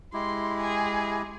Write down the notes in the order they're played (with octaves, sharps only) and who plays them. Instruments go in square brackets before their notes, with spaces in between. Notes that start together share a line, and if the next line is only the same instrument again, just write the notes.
[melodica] G#3 E4 G4 [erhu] C6
[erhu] G#4